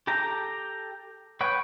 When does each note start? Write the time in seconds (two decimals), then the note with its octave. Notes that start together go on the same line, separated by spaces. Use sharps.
0.07 G4 A4 G5 A#5
1.41 B4 C#5 F#5 G5